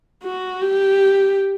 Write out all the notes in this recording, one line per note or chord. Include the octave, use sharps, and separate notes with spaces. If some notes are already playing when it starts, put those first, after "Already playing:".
F#4
G4